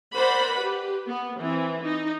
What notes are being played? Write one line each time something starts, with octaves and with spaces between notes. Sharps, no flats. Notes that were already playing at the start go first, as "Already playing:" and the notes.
A#4 C5 D5 F#5 B5
G4 B4
B3
E3 C4
D#4